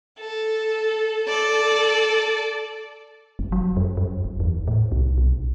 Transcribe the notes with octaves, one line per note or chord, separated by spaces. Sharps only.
A4
A4 D5
F#1
F#3
F#2
F#2
F#1
E2
A2
C2
B1